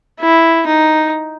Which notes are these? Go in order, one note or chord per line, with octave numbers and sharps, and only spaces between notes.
E4
D#4